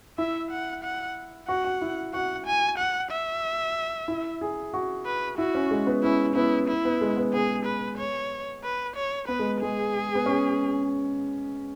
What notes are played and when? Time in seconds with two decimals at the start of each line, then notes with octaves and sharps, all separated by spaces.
0.18 E4 E5
0.51 F#5
0.84 F#5
1.48 F#4 F#5
1.64 F#4
1.82 E4
2.13 F#4 F#5
2.46 G#5
2.78 F#5
3.11 E5
4.08 E4
4.41 G#4
4.74 F#4
5.06 B4
5.38 E4 F#4
5.55 C#4
5.71 G#3
5.87 B3
6.03 C#4 E4
6.36 B3 E4
6.68 E4
6.85 B3
7.01 G#3
7.17 B3
7.33 B3 G#4
7.66 B4
7.98 C#5
8.64 B4
8.96 C#5
9.28 B3 B4
9.39 G#3
9.61 G#3 G#4
10.15 B3
10.26 C#4